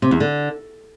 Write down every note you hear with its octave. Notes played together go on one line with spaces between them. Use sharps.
C3
E2
D3